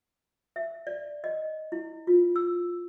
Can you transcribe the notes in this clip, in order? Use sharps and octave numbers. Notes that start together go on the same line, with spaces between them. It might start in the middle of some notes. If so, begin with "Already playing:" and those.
E5
D5
D#5
E4
F4
E6